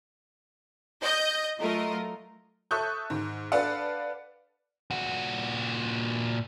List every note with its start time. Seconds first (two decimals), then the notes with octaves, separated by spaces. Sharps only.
1.01 D#5 G6
1.60 F#3 A3 F4 A#4 D#5
2.71 A4 E5 C#6 D#6 F#6 G6
3.10 G#2 D#3
3.52 D4 A4 B4 D5 F5 F#5
4.91 A#2 F#4